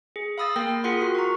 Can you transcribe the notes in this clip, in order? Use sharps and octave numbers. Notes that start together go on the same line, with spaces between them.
G#4
F5 B5 D#6 E6 A6
A#3 A#4 G5 A#6
F4 G#4 A#4 F#5 C6
F4 F#4 A#4
A#5 C#6